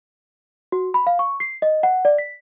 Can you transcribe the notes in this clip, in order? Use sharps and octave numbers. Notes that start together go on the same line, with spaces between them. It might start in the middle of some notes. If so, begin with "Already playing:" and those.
F#4
B5
F5
C#6
C7
D#5
F#5
D5
B6